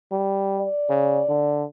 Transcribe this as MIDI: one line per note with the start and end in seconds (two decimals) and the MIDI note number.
0.12 0.66 55
0.59 1.65 74
0.90 1.23 49
1.29 1.64 50